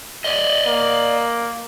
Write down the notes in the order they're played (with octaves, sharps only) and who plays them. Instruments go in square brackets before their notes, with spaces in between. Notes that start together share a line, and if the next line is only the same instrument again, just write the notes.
[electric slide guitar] D5 D#5
[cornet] A#3